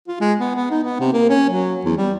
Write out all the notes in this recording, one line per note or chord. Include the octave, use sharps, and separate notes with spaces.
F4
G#3
B3
B3
D#4
B3
C3
A#3
C#4
F#3
E2
G3